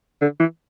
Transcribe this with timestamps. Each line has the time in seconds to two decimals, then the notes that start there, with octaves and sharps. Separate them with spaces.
0.22 D3
0.40 E3